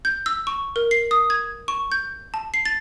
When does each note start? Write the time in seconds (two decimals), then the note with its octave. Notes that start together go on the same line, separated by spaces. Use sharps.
0.05 G6
0.26 E6
0.47 C#6
0.76 A#4
0.91 C7
1.11 D#6
1.30 G#6
1.68 C#6
1.92 G6
2.34 A5
2.54 C7
2.66 A6